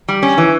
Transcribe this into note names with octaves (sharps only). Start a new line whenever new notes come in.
G3
C#4
E3